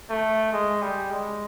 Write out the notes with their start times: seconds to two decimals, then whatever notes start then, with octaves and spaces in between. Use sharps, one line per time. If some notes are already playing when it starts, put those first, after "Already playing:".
0.10 A3
0.53 G#3
0.82 G3
1.10 G#3